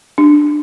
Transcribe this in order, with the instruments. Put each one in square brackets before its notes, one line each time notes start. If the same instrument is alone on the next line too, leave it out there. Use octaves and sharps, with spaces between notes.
[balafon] D4